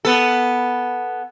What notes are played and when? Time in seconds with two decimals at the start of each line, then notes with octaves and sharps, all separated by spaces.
0.05 B3 A4